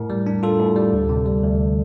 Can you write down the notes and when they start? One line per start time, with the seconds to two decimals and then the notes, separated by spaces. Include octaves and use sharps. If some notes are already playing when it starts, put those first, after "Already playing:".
Already playing: A2 A#4
0.10 G3
0.27 D4
0.43 F4 A4
0.60 A2
0.76 G3
0.93 D2
1.09 C3
1.26 G3
1.43 D2